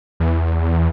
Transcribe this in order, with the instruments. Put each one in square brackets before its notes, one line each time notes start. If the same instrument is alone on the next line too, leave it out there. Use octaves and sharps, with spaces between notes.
[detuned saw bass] E2